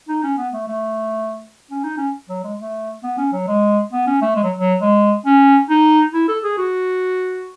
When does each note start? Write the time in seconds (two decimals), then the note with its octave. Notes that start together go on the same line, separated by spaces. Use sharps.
0.09 D#4
0.24 C#4
0.38 B3
0.53 A3
0.68 A3
1.71 C#4
1.84 D#4
1.97 C#4
2.29 F#3
2.44 G#3
2.59 A3
3.03 B3
3.18 C#4
3.33 F#3
3.48 G#3
3.93 B3
4.07 C#4
4.22 A3
4.36 G#3
4.44 F#3
4.59 F#3
4.82 G#3
5.26 C#4
5.70 D#4
6.14 E4
6.29 A4
6.44 G#4
6.58 F#4